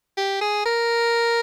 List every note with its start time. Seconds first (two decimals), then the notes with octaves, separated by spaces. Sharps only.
0.17 G4
0.41 G#4
0.65 A#4